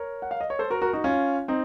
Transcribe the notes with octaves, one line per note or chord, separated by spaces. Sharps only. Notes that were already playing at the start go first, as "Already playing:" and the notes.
Already playing: A#4 C#5
F#5
F5
D#5
C#5
A4 C5
F#4 A#4
F#4 A#4
D#4 F#4
C#4 F4
C4 D#4